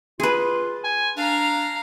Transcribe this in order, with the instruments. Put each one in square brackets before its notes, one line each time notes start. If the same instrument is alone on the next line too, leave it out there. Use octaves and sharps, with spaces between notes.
[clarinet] F4 [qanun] G#4 B4
[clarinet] G#5
[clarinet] D4 [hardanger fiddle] F5 A#5